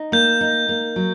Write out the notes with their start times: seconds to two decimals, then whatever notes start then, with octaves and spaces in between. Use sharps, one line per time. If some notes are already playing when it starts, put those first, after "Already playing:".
Already playing: D#4
0.12 A#3 G6
0.41 D#4
0.69 A#3
0.96 F#3